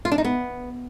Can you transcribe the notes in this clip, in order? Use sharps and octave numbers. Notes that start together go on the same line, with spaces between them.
F4
D4
D#4
B3